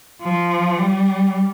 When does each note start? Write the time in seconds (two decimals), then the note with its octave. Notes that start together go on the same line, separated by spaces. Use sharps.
0.22 F3
0.78 G3